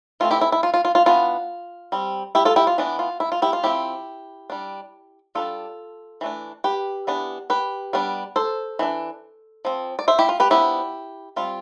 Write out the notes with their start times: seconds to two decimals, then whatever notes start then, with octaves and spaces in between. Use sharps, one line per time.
0.20 E3 A3 C4 F4
0.31 E4 G4
0.41 E4
0.52 E4
0.63 F4
0.74 F4
0.85 F4
0.95 F4
1.06 E3 B3 D4 F4
1.92 G3 C4
2.35 E4 G4
2.45 F4 A4
2.56 E4 G4
2.67 F4
2.78 E3 B3 D4
2.99 F4
3.20 E4
3.32 F4
3.42 E4 G4
3.53 F4
3.64 F3 C4 E4 G4
4.50 G3 D4
5.35 G3 B3 D4 F4 A4
6.21 E3 A3 D4
6.64 G4 B4
7.07 E3 B3 D4
7.50 G4 B4
7.93 G3 B3 D4
8.36 A4 C5
8.79 E3 A3 D4
9.65 F3 C4
9.99 D5
10.08 C5 E5
10.19 E4 G4
10.29 F4
10.40 G4 B4
10.50 F3 B3 D4 E4 G4
11.36 G3 C4 F4